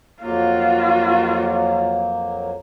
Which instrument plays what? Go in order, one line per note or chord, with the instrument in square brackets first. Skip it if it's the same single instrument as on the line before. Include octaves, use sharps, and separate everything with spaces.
[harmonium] F2 F#3 A#3 [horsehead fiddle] F4 F#4